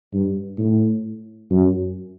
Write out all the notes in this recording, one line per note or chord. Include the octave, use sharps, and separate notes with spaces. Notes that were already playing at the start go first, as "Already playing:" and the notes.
G2
A2
F#2